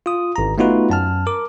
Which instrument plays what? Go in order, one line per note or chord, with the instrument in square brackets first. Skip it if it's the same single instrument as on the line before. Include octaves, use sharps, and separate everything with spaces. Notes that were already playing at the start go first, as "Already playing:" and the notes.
[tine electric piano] F4 D#6
G#1 A#5
A3 B3 D#4 F4 F#4 B4
F#2 A5 F6
A#4 D6